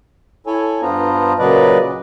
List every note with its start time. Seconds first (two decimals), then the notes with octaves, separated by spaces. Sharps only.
0.47 E4 A4 C#5 G#5
0.82 G2 B3 D4 F4 C5 A#5
1.39 A#2 C#3 F#3 B4 D5 D#5